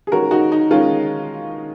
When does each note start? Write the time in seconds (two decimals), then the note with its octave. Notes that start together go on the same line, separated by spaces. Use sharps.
0.07 G#4
0.11 D#3 G#3 C#4 F#4 A#4
0.31 D#4 F#4
0.52 D#4
0.71 D#3 G#3 C#4 F4